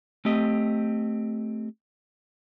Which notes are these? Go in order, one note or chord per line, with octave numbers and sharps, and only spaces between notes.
A3 C4 G4 D#5